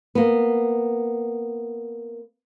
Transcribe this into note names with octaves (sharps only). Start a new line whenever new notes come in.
A#3 B3